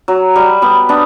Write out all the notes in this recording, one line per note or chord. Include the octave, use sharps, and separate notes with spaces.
F#3
G3
G3 B3
B3 D4